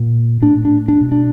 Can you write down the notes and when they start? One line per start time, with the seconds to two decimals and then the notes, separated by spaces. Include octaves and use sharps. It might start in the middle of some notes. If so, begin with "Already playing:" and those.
Already playing: A#2
0.42 A2 D4
0.65 D4
0.88 D4
1.01 B2
1.12 D4